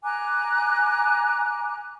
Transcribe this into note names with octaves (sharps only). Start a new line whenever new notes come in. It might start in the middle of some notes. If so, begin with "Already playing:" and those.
G#5 A#5 D6 F#6